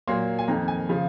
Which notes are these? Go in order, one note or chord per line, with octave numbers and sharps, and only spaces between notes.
A#2 F#3 A#3 C6
G#5
F2 D#3 A#3 A#5
G#5
C#3 F3